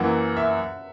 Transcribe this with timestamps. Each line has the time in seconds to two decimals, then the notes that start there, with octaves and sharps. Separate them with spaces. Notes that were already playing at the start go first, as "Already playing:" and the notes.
Already playing: F#2 E3 A#3 F#5
0.37 E5